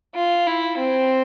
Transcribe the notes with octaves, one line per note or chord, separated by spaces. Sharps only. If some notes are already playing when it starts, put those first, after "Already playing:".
F4
E4
C4